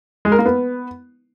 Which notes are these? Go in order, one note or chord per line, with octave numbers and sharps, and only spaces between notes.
G#3
A#4
A#3
B3